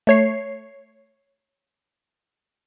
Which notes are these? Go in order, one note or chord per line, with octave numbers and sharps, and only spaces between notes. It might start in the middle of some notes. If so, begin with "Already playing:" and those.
A3 C#5 C7